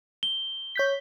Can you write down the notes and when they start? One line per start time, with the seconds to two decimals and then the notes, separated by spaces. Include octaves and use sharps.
0.23 G7
0.76 C#5 G6 B6